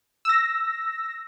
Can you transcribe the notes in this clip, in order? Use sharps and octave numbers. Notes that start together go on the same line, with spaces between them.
E6 A#6